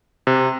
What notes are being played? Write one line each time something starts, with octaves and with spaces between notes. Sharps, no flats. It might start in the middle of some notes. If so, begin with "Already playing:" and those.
C3